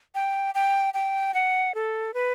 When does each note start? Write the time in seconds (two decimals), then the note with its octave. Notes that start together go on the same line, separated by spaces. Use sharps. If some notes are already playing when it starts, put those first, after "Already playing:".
0.15 G5
0.55 G5
0.94 G5
1.34 F#5
1.75 A4
2.14 B4